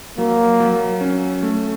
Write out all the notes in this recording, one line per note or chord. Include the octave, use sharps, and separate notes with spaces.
F#3 A#3
F#3
C#4
A3